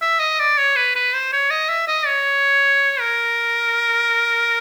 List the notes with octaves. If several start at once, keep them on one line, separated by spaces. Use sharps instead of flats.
E5
D#5
D5
C#5
B4
B4
C5
C#5
D#5
E5
D#5
C#5
A#4